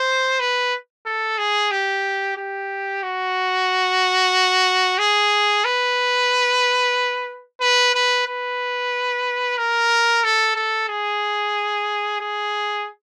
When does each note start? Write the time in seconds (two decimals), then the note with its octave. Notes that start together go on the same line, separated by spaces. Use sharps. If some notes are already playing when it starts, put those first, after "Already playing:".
Already playing: C5
0.40 B4
1.06 A4
1.38 G#4
1.71 G4
2.37 G4
3.03 F#4
4.99 G#4
5.65 B4
7.61 B4
7.94 B4
8.27 B4
9.58 A#4
10.24 A4
10.56 A4
10.89 G#4
12.20 G#4